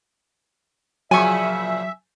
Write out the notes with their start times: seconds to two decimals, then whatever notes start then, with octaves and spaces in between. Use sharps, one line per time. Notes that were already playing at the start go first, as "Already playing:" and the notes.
1.11 A#2 C#3 F3 F#3 E5 G#5 C#6